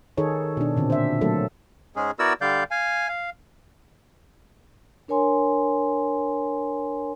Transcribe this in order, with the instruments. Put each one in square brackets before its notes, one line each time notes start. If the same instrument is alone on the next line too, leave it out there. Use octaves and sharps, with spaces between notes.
[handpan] D#3 D#4 G#4 A4 C#5
B2 D4
A#2 D3 C4
C5 E5
F#3 A3 A#3 A4
[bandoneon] G#2 G#3 C#4 G#4
B3 E4 F#4 A#4 D5 E6
D3 G3 D5 F5 G6
F5 G#5
F5
[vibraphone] D4 A#4 C#5 G#5 C6